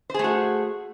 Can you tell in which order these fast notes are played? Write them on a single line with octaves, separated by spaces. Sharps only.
C5 G#4 A3 F#4